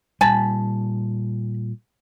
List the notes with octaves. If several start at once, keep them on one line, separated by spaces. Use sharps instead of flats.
A#2 G3 G#5 A5 B5